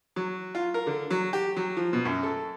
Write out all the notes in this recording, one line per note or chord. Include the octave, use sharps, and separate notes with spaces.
F#3
F4
A#4
D3
F#3
G4
F#3
F3
B2
F#2
A4